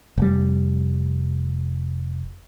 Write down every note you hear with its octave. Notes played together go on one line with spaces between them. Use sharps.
F1 G3